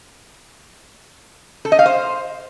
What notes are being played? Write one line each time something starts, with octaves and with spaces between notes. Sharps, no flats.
A4
D#5
F5
C5